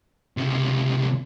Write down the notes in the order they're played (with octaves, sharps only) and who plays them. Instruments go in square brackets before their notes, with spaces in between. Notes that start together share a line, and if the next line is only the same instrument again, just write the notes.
[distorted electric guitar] C#2 C3